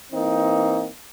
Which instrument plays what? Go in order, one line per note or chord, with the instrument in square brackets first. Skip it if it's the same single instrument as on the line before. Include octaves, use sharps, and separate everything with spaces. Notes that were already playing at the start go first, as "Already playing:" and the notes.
[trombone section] E3 A#3 C4 D#4